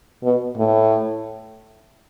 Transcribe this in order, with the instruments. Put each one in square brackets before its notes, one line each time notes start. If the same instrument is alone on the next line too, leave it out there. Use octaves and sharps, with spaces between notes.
[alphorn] B2
A2